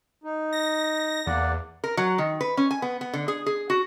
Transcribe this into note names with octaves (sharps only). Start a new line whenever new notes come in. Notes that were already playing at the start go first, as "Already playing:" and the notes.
D#4
A#6
E2 A#3 D5 F#5
A#4
F#3
D#3
B4
C#4
G#5
B3
B3
D3
G#4
G#4
F#4